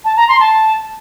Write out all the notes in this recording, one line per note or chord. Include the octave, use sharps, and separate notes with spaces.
A5
A#5
C6
A5